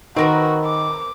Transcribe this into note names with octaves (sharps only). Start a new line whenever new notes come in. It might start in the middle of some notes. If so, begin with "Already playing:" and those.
D#3 C4 F#4 A#4 B4
D6